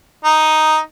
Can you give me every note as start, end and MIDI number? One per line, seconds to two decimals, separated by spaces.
0.24 0.79 63